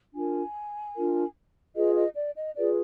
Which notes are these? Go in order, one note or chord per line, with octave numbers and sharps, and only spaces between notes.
D4 F4 A#4 G#5
D4 F4 A#4
F4 G#4 B4 D#5
D#5
D5
D#5
F4 G#4 B4 D5